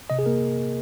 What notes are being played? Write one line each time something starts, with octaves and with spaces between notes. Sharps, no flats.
C3 D#5
G#4
A#3 A#4